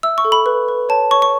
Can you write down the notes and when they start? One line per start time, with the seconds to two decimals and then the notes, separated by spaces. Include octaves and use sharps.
0.03 E5 E6
0.18 C#6
0.25 A4
0.32 B5
0.46 B4
0.68 B4
0.89 C#5 A5
1.11 C#5 C#6
1.22 C#6